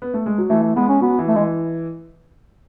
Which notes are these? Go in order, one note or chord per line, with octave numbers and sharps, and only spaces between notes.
B3
A3
G#3
F#3
E3 A3
A3
G#3 B3
C#4
F#3 B3
E3
A3
E3 G#3